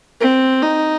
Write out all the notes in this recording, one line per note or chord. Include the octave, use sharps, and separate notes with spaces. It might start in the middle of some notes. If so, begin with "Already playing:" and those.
C4
D#4